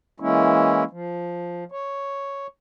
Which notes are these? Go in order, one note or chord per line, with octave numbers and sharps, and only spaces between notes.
E3 G#3 A#3 C#4 E4
F3
C#5